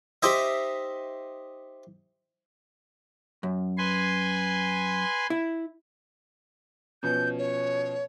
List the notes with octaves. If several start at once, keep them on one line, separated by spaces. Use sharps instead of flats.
D#4 G4 C5 D#5 E5
F#2
B4 G#5 C6
E4
B2 F3 C#4 G6
C#5